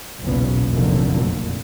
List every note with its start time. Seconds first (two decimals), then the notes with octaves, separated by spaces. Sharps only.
0.22 F#1 B1 E2 A#2 B3 C#4
0.71 F1 E2 A#2 D3 F#3 A#3